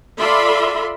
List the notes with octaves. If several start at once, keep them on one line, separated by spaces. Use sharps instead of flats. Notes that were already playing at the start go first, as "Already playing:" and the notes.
F4 A4 D5 E5 B5 C6